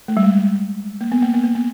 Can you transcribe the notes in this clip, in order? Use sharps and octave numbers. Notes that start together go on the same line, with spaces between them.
A3
G3
G#3
G#3
A#3
B3
A#3
B3
A#3
B3